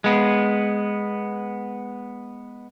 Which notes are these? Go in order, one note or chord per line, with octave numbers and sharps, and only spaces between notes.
G#3 B3